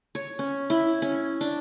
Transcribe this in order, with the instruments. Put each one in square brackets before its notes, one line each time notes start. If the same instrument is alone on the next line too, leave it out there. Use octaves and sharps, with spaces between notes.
[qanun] C#5
C#4
E4
C#4
D4